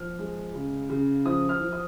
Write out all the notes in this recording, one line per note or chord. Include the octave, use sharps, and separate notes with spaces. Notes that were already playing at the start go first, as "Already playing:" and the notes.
Already playing: F3 F6
G#3
C#3
C#3
F3 D#6
F6
F3
D#6